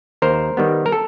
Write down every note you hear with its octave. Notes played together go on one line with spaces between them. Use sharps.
D#2 A#4 C5
D#3 G3 B3
A#4
A4